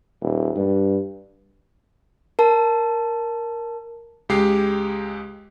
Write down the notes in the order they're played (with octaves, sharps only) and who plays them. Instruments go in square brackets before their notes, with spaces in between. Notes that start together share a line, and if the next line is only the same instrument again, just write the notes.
[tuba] D#1
G2
[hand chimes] A#4 A5
[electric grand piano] C#2 G#3 G4 C7